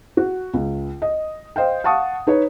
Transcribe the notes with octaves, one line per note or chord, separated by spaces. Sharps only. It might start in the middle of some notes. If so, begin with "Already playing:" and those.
F#4
C#2
D#5
C5 D#5 F5 G5
F5 F#5 A5 C#6 D#6
D#4 B4 C#5